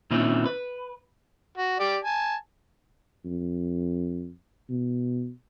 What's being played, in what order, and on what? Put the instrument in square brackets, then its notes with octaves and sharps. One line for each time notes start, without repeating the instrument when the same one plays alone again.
[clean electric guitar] A#2 D#3 C4 C#4 D#4 E4
B4
[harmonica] F#4
G4 D5
G#5 A5
[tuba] F2
B2